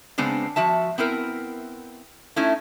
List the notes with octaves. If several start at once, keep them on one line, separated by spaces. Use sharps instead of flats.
C#3 G#3 B3 C4 D4
F3 F#4 E5 A5
B3 C4 E4 A#4
A3 C#4 D#4 E4